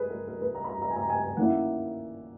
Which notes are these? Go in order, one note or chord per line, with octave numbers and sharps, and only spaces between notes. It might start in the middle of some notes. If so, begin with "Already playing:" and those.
Already playing: G#4 B4
A#4
A#4
B4
A#5
B5
A#5
A#5
G#5
A#5
G#5
G#5
D#3 A#3 C#4 E4 F#5